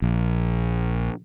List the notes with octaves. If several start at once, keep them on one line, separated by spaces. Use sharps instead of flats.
A#1